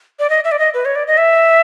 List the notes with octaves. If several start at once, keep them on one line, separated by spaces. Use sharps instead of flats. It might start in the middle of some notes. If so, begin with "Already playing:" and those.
D5
D#5
E5
D5
D#5
B4
C#5
D5
D#5
E5